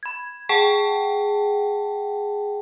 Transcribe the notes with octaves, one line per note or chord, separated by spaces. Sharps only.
B5 G#6
G#4 F#5 G5 A5